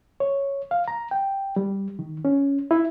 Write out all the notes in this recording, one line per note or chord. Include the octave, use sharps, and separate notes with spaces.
C#5
F5
A#5
G5
G3
D#3
C#4
E4